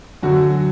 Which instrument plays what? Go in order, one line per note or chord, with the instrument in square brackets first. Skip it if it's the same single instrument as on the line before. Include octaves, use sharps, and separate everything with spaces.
[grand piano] F#2 D3 F#3 F#4